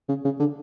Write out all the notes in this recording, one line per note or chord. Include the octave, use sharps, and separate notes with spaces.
C#3
C#3
D3